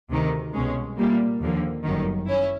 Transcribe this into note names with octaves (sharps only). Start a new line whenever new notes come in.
D2 C3 D#3
C2 B2 G#3 C#4
A#2 G3 A#3
D#2 D3 F3 A#3
G1 F#2 D#3
C#4 E4